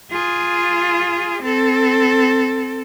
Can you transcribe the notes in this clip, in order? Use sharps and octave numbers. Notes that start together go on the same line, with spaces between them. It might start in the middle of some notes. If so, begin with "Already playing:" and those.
F4 G#4
C4 A4